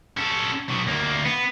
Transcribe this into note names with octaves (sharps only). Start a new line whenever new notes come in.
C#4 A4
B2 F#3
D2 A#3
B3